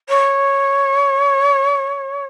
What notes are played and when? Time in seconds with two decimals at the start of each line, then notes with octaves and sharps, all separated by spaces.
0.08 C#5